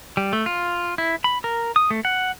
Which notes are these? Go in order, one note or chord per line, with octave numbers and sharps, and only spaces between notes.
G3
A3
F4
E4
B5
A#4
D#6
A3
F#5